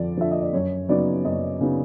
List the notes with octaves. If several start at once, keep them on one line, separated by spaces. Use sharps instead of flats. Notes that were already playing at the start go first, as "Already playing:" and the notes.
Already playing: F2 D3 F3 D5
D3 F3 E5
D#5
D5
F#2 C#5
C#3 F#3 B3 D#4 D5
F#2 D#5
C#3 F#3 B3 D#4